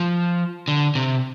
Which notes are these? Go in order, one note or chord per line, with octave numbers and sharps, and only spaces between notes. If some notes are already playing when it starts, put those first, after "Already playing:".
Already playing: F3
D3
C3